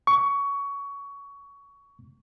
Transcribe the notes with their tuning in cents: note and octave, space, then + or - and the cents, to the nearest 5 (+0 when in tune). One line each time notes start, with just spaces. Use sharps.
C#6 +20